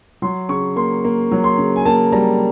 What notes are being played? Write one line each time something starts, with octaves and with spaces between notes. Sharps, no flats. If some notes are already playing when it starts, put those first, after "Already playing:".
F#3 C6
C#3 C#6
A#3 C6
A#3
F#3
C6
C#3
G#5
A#3 A5
G3 A#5